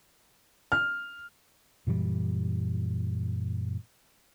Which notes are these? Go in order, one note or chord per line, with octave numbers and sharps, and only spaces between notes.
F6
F#2 A#2 E3 G3